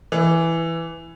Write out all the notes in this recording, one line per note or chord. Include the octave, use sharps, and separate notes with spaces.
E3